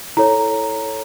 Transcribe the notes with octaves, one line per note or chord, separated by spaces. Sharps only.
E4 A4 C#5 A#5